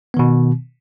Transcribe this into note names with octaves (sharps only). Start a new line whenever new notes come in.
B2 D#3 B3